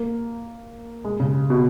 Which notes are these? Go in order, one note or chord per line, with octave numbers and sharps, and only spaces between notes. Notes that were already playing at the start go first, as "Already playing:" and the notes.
Already playing: A#3
G#3
C#3
B2